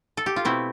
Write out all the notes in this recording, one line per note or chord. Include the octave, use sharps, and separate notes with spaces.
A4
G4
F4
B2 A3 C4 E4